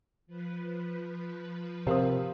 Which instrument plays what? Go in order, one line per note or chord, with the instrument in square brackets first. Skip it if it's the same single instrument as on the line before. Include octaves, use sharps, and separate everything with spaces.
[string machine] F3 B4
[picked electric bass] C3 [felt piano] C4 C5 F5 [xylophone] G4 A#4 D#6